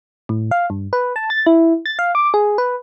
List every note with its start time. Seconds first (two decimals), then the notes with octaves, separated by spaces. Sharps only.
0.29 A2
0.51 F5
0.70 G2
0.93 B4
1.16 A5
1.30 A6
1.47 E4
1.86 A6
1.99 F5
2.15 D6
2.34 G#4
2.58 B4